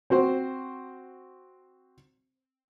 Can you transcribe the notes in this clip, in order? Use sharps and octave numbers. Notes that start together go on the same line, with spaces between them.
C4 F#4 C5